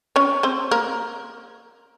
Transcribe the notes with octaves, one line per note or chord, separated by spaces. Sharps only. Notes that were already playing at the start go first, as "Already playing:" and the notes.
C#4 C#5
C4 C5
A#3 A#4